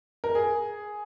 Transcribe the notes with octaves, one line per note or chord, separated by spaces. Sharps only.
A#4
G#4